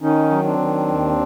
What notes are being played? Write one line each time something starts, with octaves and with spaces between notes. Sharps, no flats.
D#3 C#4 D#4
F#3
C4 D4
D#3
D#2